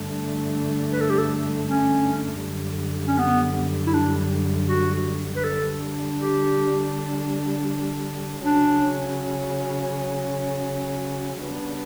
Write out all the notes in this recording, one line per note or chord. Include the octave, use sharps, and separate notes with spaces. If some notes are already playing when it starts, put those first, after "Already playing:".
Already playing: G2 D3 A3 D4
B4
A4
G4
A4
C#4
F#2 D3 G3
C#4
B3
E4
D4
F#4
B4
D3 G3 D4 A4
G4
C#3 F#3 C#4 D4
C#3 G3 B3 D4